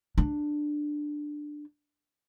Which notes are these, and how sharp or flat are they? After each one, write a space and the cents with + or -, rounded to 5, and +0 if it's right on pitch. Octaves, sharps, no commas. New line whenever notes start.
D4 +10